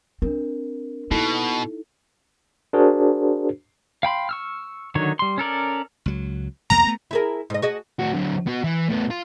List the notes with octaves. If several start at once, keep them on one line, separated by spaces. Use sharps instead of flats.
C4 D4 A#4
B2 A#3 D#4 E4 A4
D4 F#4 G#4 A#4 C5
F5 G5 B5 C6
C#6 E6 F6
D3 D#3 F#3 C#5
G3 C6
C#4 A4 A#4 D5
C#2 F#3
B1 E2 A#3 A#5
A3 B3
E4 G#4 A#4
G#2 D#5
F#4 G#4 D#5
A2 F#4
D3 F#3
B3 F#4
E3
A2 B3
F4